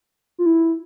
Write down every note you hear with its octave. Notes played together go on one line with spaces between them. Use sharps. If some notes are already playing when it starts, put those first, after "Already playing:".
F4
E4